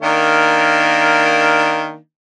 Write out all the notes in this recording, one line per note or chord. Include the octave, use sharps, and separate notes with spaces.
D#3 A#3 D4